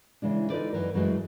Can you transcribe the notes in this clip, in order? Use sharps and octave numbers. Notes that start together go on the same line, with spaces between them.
C#3 E3 G#3 D4
D#4 F4 A4 B4 C5 D5
F#2 E3 A#4
F#2 E3 F#3 G#3 A3